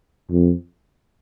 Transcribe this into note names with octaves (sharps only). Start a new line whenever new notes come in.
F2